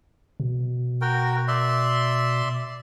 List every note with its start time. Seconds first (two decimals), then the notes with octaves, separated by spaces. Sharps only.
0.40 B2
1.01 F#4 A#4 G5
1.48 D5 E5 C6